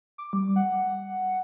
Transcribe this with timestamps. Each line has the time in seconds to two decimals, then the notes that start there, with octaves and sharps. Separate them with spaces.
0.18 D6
0.33 G3
0.56 F#5